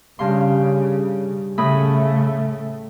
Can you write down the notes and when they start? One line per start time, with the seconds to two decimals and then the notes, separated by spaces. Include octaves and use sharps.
0.19 G2 C#3 F5 C6
1.58 A2 C#3 A3 B5 D#6